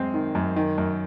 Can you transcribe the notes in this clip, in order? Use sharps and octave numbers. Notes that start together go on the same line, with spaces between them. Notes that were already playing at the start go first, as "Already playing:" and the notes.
Already playing: F#2 G#3 C4
D#3
F#2
D#3
F#2